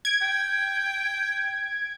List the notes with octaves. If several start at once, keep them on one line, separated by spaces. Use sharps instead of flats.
G#6 D7
G5